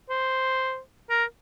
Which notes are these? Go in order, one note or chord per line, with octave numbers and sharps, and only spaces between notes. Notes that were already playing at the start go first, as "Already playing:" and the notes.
C5
A#4